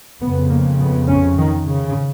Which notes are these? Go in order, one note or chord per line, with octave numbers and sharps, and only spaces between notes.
F2 C#3 B3
A#3
B3
C#4
D#3
C#3